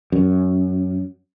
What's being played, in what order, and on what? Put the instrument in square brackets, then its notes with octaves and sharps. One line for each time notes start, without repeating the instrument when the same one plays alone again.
[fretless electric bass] F#2